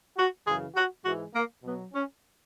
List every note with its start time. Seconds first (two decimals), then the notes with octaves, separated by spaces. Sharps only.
0.17 F#4
0.46 F#2 C#3 E3 G#4
0.75 F#4
1.04 G#2 E3 G#3 F#4
1.34 A#3
1.63 B2 F#3 B3
1.93 C#4